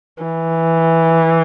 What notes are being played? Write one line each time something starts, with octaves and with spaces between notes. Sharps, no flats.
E3